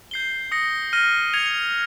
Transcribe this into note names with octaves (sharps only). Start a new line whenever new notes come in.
G6 C7 G7
D#6 A#6 C#7
F6 A#6 D#7 G7
G#6 C#7 F7